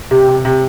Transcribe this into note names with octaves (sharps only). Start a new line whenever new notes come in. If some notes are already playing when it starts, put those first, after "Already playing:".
C3 G4
C3
C3